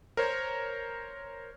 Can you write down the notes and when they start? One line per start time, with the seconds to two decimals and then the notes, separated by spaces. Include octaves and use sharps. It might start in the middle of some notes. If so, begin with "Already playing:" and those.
0.17 A#4 C5 C#5